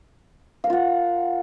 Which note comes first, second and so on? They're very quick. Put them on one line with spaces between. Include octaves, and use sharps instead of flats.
F5 A#4 F4 F#5